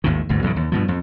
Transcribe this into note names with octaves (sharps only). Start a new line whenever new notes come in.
G#1 D#2 A2 D#3
G1 D2 G#2
B1 E2 G#2 C#3
D#2
G2 B2 F3
F2